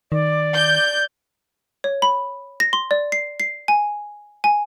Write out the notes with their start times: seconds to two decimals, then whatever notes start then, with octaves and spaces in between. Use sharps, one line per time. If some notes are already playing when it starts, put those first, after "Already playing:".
0.12 D#3 D5
0.55 G6
1.84 C#5
2.02 B5
2.60 A#6
2.73 C6
2.91 D5
3.12 C7
3.40 C7
3.68 G#5
4.44 G#5